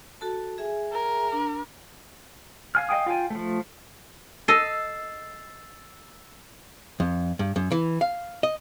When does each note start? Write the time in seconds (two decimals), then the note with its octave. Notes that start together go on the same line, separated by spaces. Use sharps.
0.21 F#4 A4 A5
0.58 G#4 E5 G#5
0.93 A#4
1.32 D4
2.75 F5 G#5 F6
2.89 D#5 F5 G5 G#5 D#6
3.06 F4 F5 G5 G#5
3.30 F3 A3
4.48 A4 D#5 E6 A6 C7
7.00 F2
7.39 G2
7.56 F#2
7.72 E3
8.01 F5
8.43 D#5